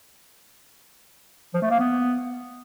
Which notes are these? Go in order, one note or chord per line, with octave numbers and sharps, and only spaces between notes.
F3
A3
A#3
B3